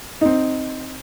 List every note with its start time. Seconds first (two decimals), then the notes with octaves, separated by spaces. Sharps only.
0.21 C4 D#4